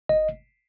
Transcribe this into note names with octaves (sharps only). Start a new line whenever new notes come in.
G1 D#5